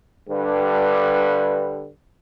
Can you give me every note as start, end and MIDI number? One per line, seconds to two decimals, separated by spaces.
0.30 1.88 43
0.30 1.88 50
0.30 1.88 55
0.30 1.88 71